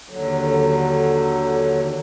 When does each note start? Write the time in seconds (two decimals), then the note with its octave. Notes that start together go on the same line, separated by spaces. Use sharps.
0.09 D#2 D3 F#3